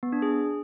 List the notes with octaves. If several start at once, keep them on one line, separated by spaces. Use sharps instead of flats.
B3
D4
G#4